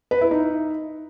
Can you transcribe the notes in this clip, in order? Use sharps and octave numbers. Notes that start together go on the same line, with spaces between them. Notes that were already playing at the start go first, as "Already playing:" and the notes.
B4
E4
D#4